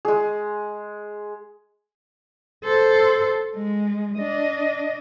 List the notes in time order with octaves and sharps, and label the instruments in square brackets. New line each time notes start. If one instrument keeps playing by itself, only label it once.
[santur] G#3 G#4
[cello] A4 C5
G#3
D4 D#5